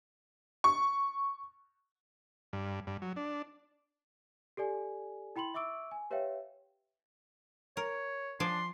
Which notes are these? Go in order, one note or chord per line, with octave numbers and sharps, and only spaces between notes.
C#6
G2
G2
F#3
D4
G4 A4 D5 G#5
E4 G5 B5 C6 F#7
E5 C#6 D6 E6 D7
G#5
G4 B4 C#5 E5 F5 G5
A#4 C#5
F3 D4 D5 G#5 C6